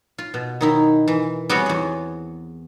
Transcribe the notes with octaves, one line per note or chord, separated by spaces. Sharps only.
F4
B2
D#3 D#4 E4
E3
G3 B3 C4 F#4 G#4 C#5
E2 G#4